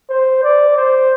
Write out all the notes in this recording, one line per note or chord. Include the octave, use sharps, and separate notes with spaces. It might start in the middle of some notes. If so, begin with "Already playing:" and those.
C5
D5
C5